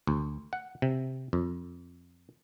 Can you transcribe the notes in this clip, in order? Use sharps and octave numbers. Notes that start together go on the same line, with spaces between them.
D2
F#5
C3
F2